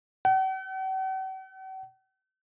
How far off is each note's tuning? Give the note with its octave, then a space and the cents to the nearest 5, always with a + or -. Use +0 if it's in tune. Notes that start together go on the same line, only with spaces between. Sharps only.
F#5 +45